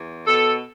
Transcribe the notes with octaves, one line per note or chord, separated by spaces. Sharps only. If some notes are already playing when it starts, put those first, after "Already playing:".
Already playing: E2
B2 A4